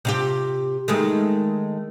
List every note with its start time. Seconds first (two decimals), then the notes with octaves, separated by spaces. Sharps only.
0.05 C3 F4 G4
0.88 D#3 G#3 A3